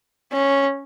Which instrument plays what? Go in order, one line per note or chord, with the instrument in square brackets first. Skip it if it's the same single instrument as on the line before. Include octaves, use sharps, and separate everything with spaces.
[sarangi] C#4